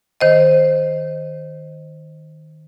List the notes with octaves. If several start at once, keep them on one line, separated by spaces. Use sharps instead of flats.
D#3 C5 D#5